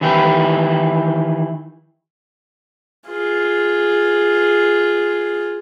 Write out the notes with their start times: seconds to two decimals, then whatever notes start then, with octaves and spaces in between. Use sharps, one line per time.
0.01 D#3 E3 E4 G4
3.09 F4 G#4